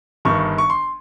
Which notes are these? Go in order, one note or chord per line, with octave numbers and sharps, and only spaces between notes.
G1 G2 D#3 C#6
C#6
C6